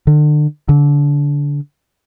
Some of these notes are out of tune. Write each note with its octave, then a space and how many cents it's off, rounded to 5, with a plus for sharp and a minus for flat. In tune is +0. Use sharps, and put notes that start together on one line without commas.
D3 +35
D3 -25